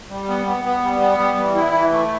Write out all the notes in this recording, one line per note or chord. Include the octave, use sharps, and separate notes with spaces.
G3
B3
B3
B3
G3
B3
G3
E3
E4
E3
A3